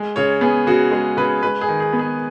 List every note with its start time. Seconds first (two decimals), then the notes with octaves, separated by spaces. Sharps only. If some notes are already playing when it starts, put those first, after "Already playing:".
Already playing: G#3
0.16 C#3 C#5
0.41 B3 G#4
0.67 C#3 F#4
0.91 G#3 G#4
1.17 C#3 B4
1.43 G#3 B4
1.61 G#4
1.68 D#3
1.80 G#4
1.93 B3
1.99 G#4